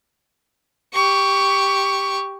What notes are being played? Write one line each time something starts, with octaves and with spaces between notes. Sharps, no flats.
G4 C#6